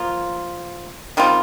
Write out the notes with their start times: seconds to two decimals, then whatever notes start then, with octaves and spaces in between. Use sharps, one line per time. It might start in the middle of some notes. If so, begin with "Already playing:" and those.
Already playing: F3 A#3 F4
1.17 D#3 G3 C4 F4